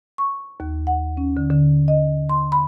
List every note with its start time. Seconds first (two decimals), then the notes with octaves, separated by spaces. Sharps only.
0.18 C#6
0.60 D#2
0.87 F#5
1.17 C#4
1.37 D3
1.51 D3
1.88 D#5
2.29 C6
2.52 B5